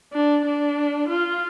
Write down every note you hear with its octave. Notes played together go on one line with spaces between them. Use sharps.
D4
D4
F4